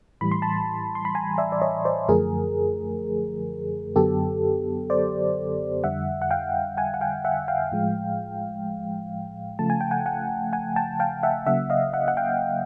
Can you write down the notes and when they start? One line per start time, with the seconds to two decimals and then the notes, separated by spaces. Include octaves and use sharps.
0.21 A2 E3 G3 B5
0.32 C6
0.42 A5 B5
0.95 C6
1.05 B5
1.14 G#5 A#5
1.38 D5 E5
1.52 D5
1.62 C#5 D#5
1.85 C5 D5
2.09 F#2 D3 F3 A3 G#4 A#4
3.96 F#2 D3 F#3 B3 G4 A4
4.90 C5 D5
5.84 F2 D3 G3 E5 F#5
6.22 F#5
6.31 F5 G5
6.77 F#5 G#5
6.94 F#5
7.01 F5 G5
7.25 E5 F#5
7.48 F5 G5
7.72 A2 F3 G#3
9.59 C#3 F3 A3 A5
9.70 G#5
9.81 G5
9.91 F#5 G#5
10.06 F#5 G#5
10.53 F#5 G#5
10.76 G5 A5
11.00 F5 G5
11.23 E5 F#5
11.47 C#3 F#3 A#3 E5 F#5
11.70 D#5 F5
11.93 E5 F#5
12.08 F#5
12.17 F5 G5